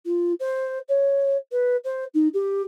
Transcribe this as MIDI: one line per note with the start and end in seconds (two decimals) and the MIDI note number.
0.05 0.32 65
0.40 0.79 72
0.88 1.36 73
1.51 1.76 71
1.84 2.04 72
2.14 2.28 63
2.33 2.62 67